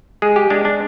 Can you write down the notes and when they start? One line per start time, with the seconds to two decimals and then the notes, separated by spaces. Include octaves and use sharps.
0.22 G#3 G#4
0.36 G4
0.50 G#3 D4
0.65 D4